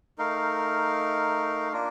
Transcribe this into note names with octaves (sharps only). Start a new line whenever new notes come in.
A3 D#4 A#4 F5
A#3 D4 F4 A#4